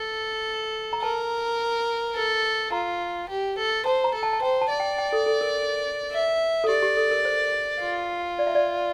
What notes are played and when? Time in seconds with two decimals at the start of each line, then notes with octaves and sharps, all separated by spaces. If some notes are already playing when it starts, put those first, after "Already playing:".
Already playing: A4
0.93 A#5
1.02 A#4 A5
2.15 A4
2.72 F4 A#5
3.29 G4
3.58 A4
3.86 C5 A5
4.04 A#5
4.14 A4
4.23 A5
4.33 A5
4.42 C5 G5
4.61 A5
4.70 D5
4.80 G5
4.98 G5
5.13 A4
5.26 A4
5.41 A#4
6.12 E5
6.64 A4
6.68 G4 D5
6.83 G4
6.97 A4
7.11 A#4
7.25 C5
7.81 F4
8.39 D5
8.47 E5
8.55 D5